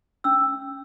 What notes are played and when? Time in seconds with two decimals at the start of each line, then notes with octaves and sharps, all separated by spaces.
0.24 C#4 E6